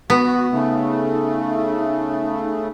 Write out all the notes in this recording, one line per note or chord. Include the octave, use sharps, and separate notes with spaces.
B3 F#4
C#3 A3 D#4